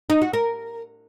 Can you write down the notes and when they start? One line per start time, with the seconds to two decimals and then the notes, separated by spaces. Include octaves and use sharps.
0.10 D#4
0.22 F#4
0.33 A#4